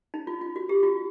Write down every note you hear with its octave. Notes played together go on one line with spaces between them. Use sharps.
D#4
F4
F4
F#4
G4
F4